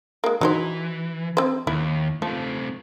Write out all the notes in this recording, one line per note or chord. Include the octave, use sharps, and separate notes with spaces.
G#3 A#3
E3 F#3 D#4 C5
C4 C5
D#2 E4
F3 A3 C4